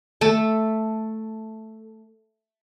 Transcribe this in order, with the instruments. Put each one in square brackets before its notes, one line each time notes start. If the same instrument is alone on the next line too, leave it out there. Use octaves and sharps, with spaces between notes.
[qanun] A3 A4 A5